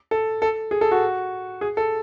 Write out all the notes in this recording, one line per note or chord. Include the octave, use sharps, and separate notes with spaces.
A4
A4
G#4
A4
F#4
G#4
A4